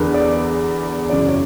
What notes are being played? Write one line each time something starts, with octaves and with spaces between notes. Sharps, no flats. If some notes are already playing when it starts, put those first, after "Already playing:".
Already playing: E2 D3 A#4 B4
D5
F#2 C#3 E3 D5
C#5